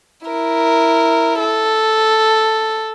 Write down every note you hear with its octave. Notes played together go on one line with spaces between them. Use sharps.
E4 A#4
A4